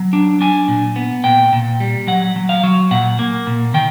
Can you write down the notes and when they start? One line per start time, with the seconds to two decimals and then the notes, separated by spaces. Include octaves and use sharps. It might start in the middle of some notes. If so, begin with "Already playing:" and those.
Already playing: F#3
0.13 D4
0.41 D4 G#5
0.68 A#2
0.96 B3
1.24 A#2 G5
1.53 A#2
1.80 G3
2.07 F#3 F#5
2.36 F#3
2.49 F5
2.63 F#3
2.91 A#2 F#5
3.19 A#3
3.47 A#2
3.74 D#3 G5